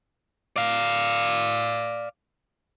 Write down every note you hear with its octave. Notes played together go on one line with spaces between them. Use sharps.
D5 F5